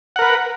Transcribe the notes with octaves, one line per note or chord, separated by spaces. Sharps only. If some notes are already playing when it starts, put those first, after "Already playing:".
A#4 B4 F#5